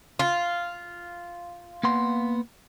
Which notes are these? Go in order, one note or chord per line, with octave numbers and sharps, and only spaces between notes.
F4
A#3 B3 C6